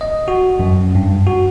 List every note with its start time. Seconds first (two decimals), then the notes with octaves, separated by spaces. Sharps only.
0.01 D#5
0.28 F#4
0.59 F#2
0.95 G2
1.27 F#4